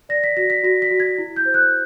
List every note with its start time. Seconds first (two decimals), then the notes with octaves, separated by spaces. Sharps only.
0.09 D5 A#6
0.24 B6
0.37 F#4 A#6
0.50 B6
0.63 F#4 A#6
0.82 B6
0.91 F#4
1.00 G#6
1.18 E4
1.36 G6
1.45 C5
1.54 F#6